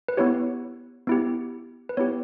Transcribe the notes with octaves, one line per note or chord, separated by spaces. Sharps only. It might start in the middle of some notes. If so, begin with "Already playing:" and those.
B4
B3 E4 G4 C#5
B3 E4 G4
B4
B3 E4 G4 C#5